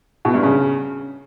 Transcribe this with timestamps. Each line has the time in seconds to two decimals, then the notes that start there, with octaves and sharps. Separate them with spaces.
0.25 B2
0.34 G2
0.43 C#3